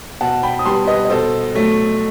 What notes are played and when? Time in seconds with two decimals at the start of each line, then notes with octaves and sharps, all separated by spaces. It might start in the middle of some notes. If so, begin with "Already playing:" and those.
0.21 B2 F#5 A5
0.43 G5 B5
0.59 D#6
0.65 G3 B3 A5 C6
0.87 B4 D#5
1.05 D#5
1.10 B2 A4 C5
1.55 F#3 A3